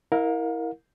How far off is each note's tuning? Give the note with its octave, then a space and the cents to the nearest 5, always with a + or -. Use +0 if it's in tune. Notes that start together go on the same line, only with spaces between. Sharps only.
E4 -20 A#4 +0 F5 +40